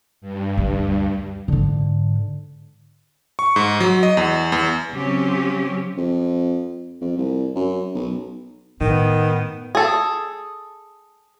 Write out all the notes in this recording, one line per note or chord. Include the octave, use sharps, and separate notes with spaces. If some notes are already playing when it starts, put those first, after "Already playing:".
G2
D2
G#2 D3
C#6
G#2
F#3
D#5
E2
E2
C#3 F#3 C4 C#4 G4
F2
F2
C2
F#2
B1
A2 D#3 B3
G#4 A4